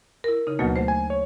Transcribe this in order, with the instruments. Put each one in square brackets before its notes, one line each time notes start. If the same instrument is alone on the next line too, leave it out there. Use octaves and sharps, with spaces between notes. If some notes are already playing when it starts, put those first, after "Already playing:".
[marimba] E4 A#4
C#3 D#4
[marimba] D2 F#3 A#3 [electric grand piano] B2
[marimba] A3 C5
[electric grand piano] G#5
C#5